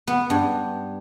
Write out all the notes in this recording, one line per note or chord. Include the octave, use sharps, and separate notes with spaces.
B3
G2